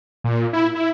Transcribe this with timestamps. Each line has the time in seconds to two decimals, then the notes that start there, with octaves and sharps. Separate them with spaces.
0.24 A#2
0.53 E4
0.76 E4